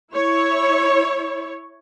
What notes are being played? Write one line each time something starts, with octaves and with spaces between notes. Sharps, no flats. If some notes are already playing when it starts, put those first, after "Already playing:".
E4 C#5